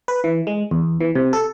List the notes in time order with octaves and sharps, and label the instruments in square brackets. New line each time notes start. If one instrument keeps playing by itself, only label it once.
[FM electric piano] B4
E3
G#3
E2
E3
C3
A4